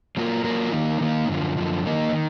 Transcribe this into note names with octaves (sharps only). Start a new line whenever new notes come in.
F#3 A#3 F4 A#4
F#3 A#3 F4 A#4
D#3 A#3 D#4
D#3 A#3 D#4
F#2 D3 F3
F#2 D3 F3
D#3 A#3 D#4
D#3